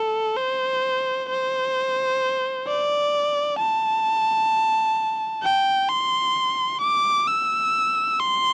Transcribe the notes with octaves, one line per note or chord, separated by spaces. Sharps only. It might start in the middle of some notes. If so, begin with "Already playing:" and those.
Already playing: A4
C5
C5
D5
A5
G5
C6
D6
E6
C6